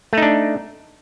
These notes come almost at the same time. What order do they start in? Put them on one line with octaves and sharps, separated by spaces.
A3 D#4 D4